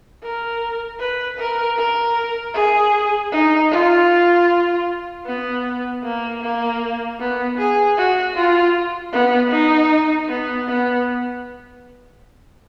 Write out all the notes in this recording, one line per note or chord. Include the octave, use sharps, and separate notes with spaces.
A#4
B4
A#4
A#4
G#4
D#4
F4
B3
A#3
A#3
B3
G#4
F#4
F4
B3
D#4
B3
B3